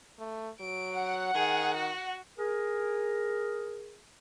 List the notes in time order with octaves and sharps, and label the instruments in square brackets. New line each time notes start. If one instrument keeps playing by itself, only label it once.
[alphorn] A3
[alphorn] F#3 [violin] D7
[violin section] F#5
[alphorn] D#3 [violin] G#4
[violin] F#4
[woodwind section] G#4 A#4